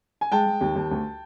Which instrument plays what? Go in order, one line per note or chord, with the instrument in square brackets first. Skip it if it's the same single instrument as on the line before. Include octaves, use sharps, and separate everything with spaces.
[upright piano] G#5
G#3 G5 A5
G#3
D#2
D#2
D2